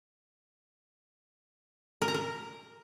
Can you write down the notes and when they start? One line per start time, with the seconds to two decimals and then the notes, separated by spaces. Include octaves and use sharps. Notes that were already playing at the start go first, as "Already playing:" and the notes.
2.02 A#4
2.08 A#5
2.14 A#4